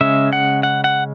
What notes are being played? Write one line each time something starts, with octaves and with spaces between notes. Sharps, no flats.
C#3 G#3 C#4 E5
F#5
F#5
F#5